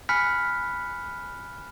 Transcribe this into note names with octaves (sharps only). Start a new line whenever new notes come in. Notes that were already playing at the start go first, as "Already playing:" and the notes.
G#5 B5 F6 F#6 B6 C#7